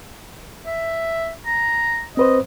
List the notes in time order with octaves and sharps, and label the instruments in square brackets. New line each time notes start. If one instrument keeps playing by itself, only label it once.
[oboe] E5
A#5
[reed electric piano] C4 B4 C5 [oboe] D#5